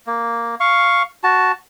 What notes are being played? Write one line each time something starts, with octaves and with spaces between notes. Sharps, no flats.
A#3
F5 C#6
F#4 A5